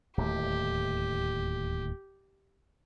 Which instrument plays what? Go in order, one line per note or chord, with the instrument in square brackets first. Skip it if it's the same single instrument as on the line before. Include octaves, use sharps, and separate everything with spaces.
[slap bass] D1 D#2 A3 [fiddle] G4